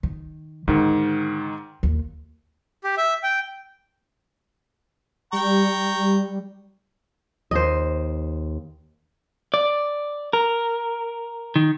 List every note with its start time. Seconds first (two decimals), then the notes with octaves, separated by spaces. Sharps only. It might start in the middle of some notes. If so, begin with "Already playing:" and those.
0.03 D#3
0.68 G#2 D3 D#3
1.83 D#2
2.84 G4
2.98 E5
3.23 G5
5.33 G3 G5 A#5 C#6
7.51 D#2 C5 D#5
9.54 D5
10.33 A#4
11.56 D#3